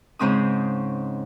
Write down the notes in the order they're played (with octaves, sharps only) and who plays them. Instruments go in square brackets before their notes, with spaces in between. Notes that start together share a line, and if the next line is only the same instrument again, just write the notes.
[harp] G#2 C#3 C4 C#4 D#6